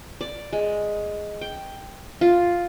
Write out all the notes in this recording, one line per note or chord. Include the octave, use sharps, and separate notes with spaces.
D5
G#3
G5
F4